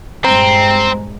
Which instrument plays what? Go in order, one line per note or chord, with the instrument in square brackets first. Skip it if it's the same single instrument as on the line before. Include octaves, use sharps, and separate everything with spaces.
[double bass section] G2 A#2 G#3 [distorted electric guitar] C4 [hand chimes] C5 A#5